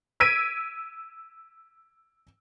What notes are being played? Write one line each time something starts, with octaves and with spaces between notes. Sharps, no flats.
E6 G#6 B6 D7 D#7